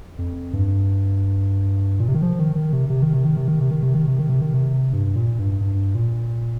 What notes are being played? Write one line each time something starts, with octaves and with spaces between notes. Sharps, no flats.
F2
G2
A#2
C3
D#3
F3
D#3
D#3
C3
C3
D#3
C3
D#3
C3
D#3
C3
D#3
C3
D#3
C3
D#3
C3
D#3
C3
G2
A#2
G2
G2
A#2